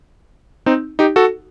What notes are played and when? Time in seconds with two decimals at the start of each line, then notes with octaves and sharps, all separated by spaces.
0.66 C4 D#4
0.99 D#4 G4
1.16 F#4 A4